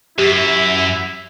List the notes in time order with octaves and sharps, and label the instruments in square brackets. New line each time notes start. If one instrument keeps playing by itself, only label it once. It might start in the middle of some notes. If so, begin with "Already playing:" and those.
[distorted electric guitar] F#2 [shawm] E4 [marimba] G4